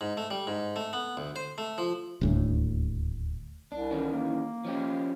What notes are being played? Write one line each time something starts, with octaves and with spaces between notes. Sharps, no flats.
G#2
A3
G3
G#2
A3
B3
D2
C5
A3
F3
D#1 D2 A2
C2 D4
D#3 E3 C#4
A#3
F3 C#4 G4